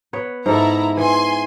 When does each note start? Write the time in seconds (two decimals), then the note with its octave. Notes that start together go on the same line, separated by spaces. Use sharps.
0.13 B3 B4 C#5
0.46 G#2 E4 A4 A#5
0.97 E3 G#5 C6